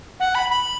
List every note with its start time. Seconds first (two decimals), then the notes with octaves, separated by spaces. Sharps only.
0.20 F#5
0.35 B5
0.50 B5